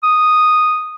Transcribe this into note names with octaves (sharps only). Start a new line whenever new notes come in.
D#6